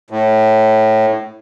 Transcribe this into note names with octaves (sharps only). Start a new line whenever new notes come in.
A2